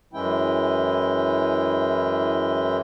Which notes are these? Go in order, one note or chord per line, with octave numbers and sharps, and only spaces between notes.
F#2 E3 G#3 C#4 E4 G5